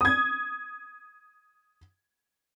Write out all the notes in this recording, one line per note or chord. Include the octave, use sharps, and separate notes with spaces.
D#6 G#6